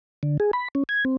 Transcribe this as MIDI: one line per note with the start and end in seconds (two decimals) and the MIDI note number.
0.23 0.38 50
0.40 0.51 68
0.53 0.68 83
0.75 0.84 61
0.89 1.05 92
1.05 1.17 60